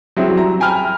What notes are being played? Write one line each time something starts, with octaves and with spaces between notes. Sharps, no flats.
F#3 G3 C4 E4 G#4
A#5
G5 G#5 A#5 B5 F6